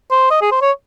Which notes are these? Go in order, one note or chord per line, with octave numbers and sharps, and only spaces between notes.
C5
D#5
G#4
C5
C#5